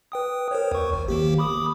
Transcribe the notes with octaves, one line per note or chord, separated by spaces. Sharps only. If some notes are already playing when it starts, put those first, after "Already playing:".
B4 G5 D#6
A#4 C5 C#5
D#2 C#6
G#1
D#3 A#3 G4
B5 D6 D#6